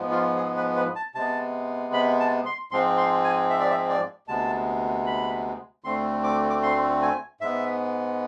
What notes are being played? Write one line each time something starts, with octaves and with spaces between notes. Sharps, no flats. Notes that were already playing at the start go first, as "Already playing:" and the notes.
Already playing: G#2 F3 G#3 B3
F4
G#4
B4
B4
A5
C3 G#3 B3 A5
B5
A5
C6
G#2 F3 G#3 C4 C6
C6
G#5
E5
D5
E5
D5
D2 C3 G#3 B3 A5
B5
D2 D3 A3 C4 C6
D6
D6
C6
G#5
G#2 G#3 B3 E5